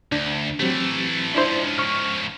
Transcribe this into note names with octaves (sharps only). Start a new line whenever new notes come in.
D2 D4
E3 F#3 A3 C4 G4
C#2 F3 D4 E4 C5
C#6 F6